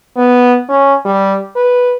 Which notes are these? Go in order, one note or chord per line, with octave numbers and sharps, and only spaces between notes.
B3
C#4
G3
B4